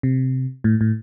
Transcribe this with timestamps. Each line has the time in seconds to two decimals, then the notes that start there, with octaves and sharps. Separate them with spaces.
0.03 C3
0.64 A2
0.81 A2